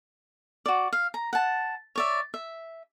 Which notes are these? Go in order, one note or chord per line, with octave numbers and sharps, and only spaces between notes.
F#4 D5
F5
A#5
F#5 A5
C#5 D5 E5
E5